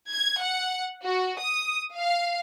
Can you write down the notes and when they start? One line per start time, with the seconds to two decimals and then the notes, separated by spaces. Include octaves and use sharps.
0.10 G#6
0.42 F#5
1.04 F#4
1.39 D#6
1.96 F5